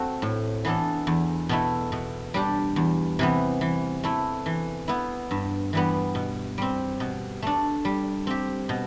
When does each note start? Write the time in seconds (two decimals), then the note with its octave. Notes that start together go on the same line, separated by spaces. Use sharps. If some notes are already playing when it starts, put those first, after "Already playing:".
Already playing: A3 C4 F#4
0.22 A2
0.65 E3 B3 D4 A4
1.07 E2
1.49 B2 A3 E4
1.92 B2
2.34 G3 D4 G4
2.76 E2
3.19 C3 E3 B3
3.61 E3
4.04 A3 E4
4.46 E3
4.88 B3 E4
5.31 G2
5.73 E3 G3 B3
6.15 B2
6.58 G3 C4
7.00 B2
7.42 A3 D4
7.85 G3
8.27 C4 G4
8.69 B2